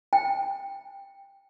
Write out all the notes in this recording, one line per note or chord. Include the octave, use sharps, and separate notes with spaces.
G5